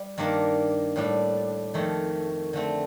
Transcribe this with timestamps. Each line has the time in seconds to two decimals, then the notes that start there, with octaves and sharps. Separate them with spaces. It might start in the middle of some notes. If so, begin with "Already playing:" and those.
Already playing: G3
0.18 G2 D#3 A#3 D4
0.96 A2 G3 D4
1.74 F2 D#3 A3
2.53 D3 A3 C4